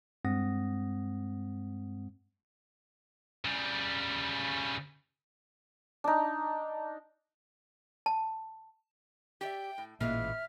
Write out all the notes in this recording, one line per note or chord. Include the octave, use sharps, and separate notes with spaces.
G2 G#3 C4 F#5 D#6 A#6
C#3 G3
D4 D#4
A5
G4 D5 E5 G5
A2
A1 A#2 E3 G#3 A#3 F4 E5 F6